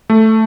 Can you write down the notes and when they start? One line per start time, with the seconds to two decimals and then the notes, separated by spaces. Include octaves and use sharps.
0.10 A3